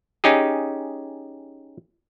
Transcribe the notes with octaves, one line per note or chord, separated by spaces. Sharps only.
C#4 D#4 G4 G#4